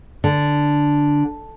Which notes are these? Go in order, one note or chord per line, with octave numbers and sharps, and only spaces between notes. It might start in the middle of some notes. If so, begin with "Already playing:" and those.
D3